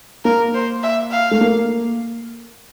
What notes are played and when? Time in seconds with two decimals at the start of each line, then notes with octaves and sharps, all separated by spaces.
0.25 A#3 A#4
0.54 C5
0.83 E5
1.12 F5
1.31 A3
1.41 A#3